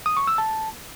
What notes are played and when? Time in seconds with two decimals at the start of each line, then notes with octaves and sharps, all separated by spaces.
0.06 D#6
0.17 C#6
0.27 E6
0.38 A5